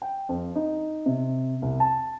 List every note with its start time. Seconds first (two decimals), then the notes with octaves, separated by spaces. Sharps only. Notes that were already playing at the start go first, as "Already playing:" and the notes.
0.02 G5
0.29 F2
0.55 D#4
1.06 C3
1.62 C2
1.80 A5